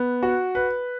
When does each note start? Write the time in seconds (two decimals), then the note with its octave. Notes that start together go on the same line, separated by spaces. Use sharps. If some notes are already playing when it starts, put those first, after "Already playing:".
Already playing: B3
0.23 F#4
0.55 B4